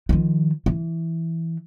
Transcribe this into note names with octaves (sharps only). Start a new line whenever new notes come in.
D#3 F3
E3